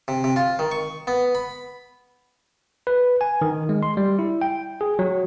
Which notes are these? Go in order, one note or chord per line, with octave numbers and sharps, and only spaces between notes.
C3
C3
F4
D#3
C#6
B3
B5
B4
G#5
D#3
G#3
C6
G3
E4
G5
G#4
F#3